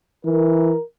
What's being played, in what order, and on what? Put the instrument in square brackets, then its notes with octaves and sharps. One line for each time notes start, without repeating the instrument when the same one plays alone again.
[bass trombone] E3 [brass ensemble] A#4